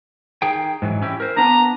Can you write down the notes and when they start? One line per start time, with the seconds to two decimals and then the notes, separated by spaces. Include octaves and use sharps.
0.42 D#3 G#4 G5
0.82 G#2 E3 F#3
1.02 C#4 E4 G4
1.20 A#4 C5
1.37 B3 D4 A#5